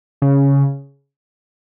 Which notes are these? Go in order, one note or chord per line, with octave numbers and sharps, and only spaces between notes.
C#3